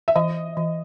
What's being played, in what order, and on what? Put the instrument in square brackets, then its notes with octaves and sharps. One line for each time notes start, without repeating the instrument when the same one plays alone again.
[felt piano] E5
[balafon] E3 [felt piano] D#5
[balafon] E3